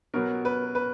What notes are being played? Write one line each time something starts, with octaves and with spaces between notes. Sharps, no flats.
B2 F#3 B3 A#4
B4
B4